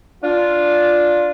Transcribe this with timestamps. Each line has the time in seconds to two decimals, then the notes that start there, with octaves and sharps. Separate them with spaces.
0.23 D4 F4